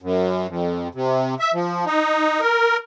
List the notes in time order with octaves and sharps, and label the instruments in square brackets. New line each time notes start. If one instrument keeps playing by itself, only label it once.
[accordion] F#2
F2
C3
E5
F3
D#4
A#4